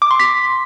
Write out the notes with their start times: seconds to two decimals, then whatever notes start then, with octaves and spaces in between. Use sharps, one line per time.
0.02 D6
0.11 C6
0.20 B6